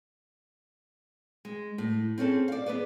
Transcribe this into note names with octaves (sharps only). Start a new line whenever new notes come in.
G#3
A2
C4 C#4 G#4 A4
D5 F5
B3 G#4 B4 D5